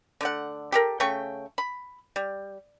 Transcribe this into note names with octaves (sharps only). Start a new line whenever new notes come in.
D3 A3 F#5
G4 A4 A#4
C#3 A3 G5 C#6
B5
G3